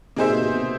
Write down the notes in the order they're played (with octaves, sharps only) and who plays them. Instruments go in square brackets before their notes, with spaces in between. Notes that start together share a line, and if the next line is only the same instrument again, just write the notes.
[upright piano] C3 [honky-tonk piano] A#3 D#4 G#4 C5 E5
[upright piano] B2
B2
C3